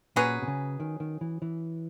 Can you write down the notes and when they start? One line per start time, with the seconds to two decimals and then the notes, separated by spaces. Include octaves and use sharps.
0.16 A#2 F#3 C#4 G#4 B4
0.42 B2
0.48 C#3
0.80 D#3
1.00 D#3
1.21 E3
1.42 E3